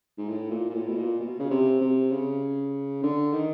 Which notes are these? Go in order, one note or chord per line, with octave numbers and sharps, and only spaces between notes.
G#2
A2
A#2
A#2
A2
B2
A#2
B2
C#3
C3
C3
C#3
D3
D#3